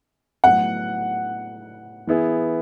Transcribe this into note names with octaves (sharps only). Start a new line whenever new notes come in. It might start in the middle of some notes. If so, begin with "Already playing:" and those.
A2 F#3 B3 F#5
E3 B3 E4 G#4